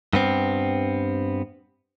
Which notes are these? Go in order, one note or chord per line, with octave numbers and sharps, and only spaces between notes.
G2 B3 C4